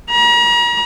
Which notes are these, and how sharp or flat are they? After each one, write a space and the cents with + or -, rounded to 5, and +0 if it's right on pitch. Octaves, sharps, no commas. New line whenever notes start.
A#5 +40